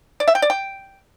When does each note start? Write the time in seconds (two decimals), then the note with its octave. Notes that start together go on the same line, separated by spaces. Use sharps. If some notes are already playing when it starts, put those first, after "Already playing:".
0.20 D5
0.28 E5
0.35 G5
0.42 D5
0.50 G5